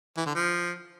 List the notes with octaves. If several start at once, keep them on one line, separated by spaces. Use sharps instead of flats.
E3
D3
F3